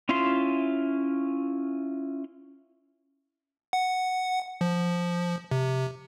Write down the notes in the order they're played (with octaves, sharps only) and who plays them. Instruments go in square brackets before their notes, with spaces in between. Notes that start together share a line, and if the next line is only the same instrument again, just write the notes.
[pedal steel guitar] C#4 E4 F4 E5 C6
[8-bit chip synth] F#5
F3
C3